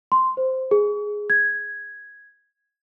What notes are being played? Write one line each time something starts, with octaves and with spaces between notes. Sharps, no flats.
C6
C5
G#4
G#6